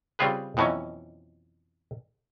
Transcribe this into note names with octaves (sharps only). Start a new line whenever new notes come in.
C#3 G3 C4 F4 G#4 B4
F2 B2 E3 F#3 C#4